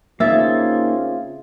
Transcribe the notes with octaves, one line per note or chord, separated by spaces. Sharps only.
C#3 A#3 C4 D#4 F4 E5 G#5 A6